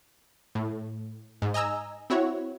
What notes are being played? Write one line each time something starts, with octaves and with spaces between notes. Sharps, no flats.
A2
G#2
D#5 G#5 A#5 E6
C4 E4 F#4 C#5